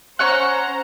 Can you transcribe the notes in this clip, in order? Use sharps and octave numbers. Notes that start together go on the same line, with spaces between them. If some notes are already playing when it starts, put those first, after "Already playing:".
C#4 C5 F#5 A#5 C#6 F#6